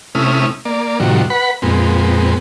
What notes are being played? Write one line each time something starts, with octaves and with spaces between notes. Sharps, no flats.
C3 A3 C#4 E4 D#6 F6
A#3 D5
A2 C3 D#3 F3 G3 F#4
B4 F#5 B5
F2 A#2 G#3 B3 C4